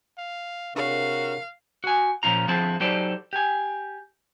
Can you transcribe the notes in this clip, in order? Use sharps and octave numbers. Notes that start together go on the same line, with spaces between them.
F5
C3 D4 F#4 G#4 A#4 C#5 F5
F#4 G#5
A#2 F3 C#4 F4 A#5
D3 F3 C4 E4 G#4 A5
F#3 D#4 G4 A4 C5 D5
G4 G#5